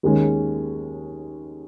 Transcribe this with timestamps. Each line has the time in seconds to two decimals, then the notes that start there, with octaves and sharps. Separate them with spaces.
0.03 D#2 D#3 G#3 C#4